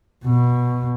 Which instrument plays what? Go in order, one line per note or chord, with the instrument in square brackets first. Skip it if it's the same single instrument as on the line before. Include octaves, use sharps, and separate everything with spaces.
[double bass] B2